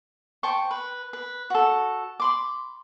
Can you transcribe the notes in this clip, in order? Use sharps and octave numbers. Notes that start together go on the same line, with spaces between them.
C5 G5 A5 C#6
B4
B4
F#4 A4
B5 C6 D6